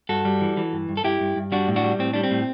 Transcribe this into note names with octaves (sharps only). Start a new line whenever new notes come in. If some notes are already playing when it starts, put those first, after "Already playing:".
G2 F#4 A4
G3
E3
E3
G2
G2
A4
G2 E4 G4
G2
G2
G3 D4 F#4
A2
D4 F#4
G3
A2 C4
G3 D4
C4
A2